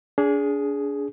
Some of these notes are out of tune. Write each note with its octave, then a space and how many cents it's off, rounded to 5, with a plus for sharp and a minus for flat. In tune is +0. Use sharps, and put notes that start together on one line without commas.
D4 -35 G#4 +0